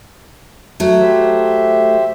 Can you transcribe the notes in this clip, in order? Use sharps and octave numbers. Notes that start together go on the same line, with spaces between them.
F#3 A3
G4 C5 E5